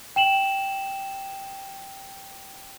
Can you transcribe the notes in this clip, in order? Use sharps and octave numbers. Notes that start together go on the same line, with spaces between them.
G5 E7 F#7